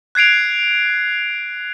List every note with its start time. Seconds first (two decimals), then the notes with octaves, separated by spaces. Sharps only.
0.15 F#6 G#6 C7 D7 F7